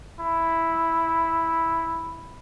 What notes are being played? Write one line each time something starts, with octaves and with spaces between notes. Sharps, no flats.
E4